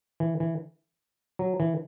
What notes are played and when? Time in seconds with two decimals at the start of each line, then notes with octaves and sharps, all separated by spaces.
0.20 E3
0.40 E3
1.39 F#3
1.60 E3